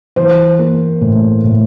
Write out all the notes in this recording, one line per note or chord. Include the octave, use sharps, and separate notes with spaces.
E3 C5
A#3
A2
A2